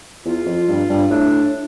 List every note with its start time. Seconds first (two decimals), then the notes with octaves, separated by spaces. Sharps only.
0.25 E2 F4
0.46 F2
0.68 G2
0.89 G2
1.10 A2 D4